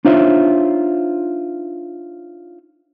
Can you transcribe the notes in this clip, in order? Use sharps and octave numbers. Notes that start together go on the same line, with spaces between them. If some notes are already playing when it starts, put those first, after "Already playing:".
D4 D#4 F4 C5 C#5 E5